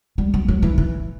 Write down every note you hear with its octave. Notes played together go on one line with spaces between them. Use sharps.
G3
F#3
F#3
E3
E3